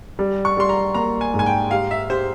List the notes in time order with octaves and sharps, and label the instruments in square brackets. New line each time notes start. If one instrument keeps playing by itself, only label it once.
[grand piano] G3
[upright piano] C#6
[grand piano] G3 [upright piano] C6
[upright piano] A#5
[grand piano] A#3 [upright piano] A#5
[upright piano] G#5
[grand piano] G#2
[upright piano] G#5
G5
[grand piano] G4 [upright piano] F5
[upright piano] E5
[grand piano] G4 [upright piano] C5